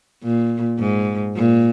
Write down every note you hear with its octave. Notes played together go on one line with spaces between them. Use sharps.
A#2
G#2
A#2